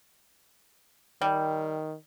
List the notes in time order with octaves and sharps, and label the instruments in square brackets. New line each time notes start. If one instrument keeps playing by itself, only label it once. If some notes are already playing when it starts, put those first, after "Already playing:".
[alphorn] D#3 [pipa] G3